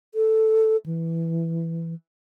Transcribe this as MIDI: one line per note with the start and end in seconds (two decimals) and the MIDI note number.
0.15 0.77 69
0.86 1.94 52